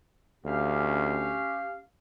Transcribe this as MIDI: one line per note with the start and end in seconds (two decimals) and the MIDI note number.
0.45 1.41 38
0.45 1.80 61
0.45 1.80 67
0.45 1.80 77